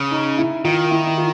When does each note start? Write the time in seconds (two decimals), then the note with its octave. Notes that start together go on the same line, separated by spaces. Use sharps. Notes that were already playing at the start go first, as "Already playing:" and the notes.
Already playing: C#3
0.11 D#4
0.38 E4
0.64 D#3 F4
0.91 E4
1.06 E4
1.18 F4